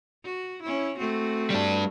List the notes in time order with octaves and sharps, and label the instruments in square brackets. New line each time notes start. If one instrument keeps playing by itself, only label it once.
[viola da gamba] F#4
C#4 E4
A3 C4 F#4
[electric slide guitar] G3 D4